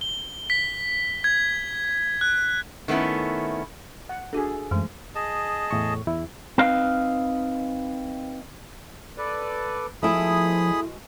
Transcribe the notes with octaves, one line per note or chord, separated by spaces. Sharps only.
G7
B6
G#6
F#6
D#3 A3 B3 C#4 E4
F#5
D4 F#4 G#4 A4
F#2 E3 G#3 A3
G#4 D#5 A5
E2 A2 C#6
E2 E4
C4 D#4 B4 D#5 F5
A4 B4 D5
B2 F3 G#3 A3 E4 G#4 B5 D#6